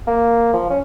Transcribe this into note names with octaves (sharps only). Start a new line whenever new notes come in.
A#3
F3
C#4